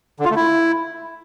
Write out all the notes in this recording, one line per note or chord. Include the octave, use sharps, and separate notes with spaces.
D3
F4
A3
E4